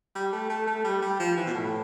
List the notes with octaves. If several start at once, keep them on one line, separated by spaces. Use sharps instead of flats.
G3
A3
A3
A3
G3
G3
F3
E3
B2
A2